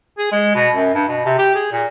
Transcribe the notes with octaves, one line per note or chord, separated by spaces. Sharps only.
G#4
G#3
B2
F#2
G2
B2
C3
G4
G#4
A#2